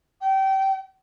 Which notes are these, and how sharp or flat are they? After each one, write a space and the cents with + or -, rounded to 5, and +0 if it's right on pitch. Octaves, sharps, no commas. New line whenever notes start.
G5 -25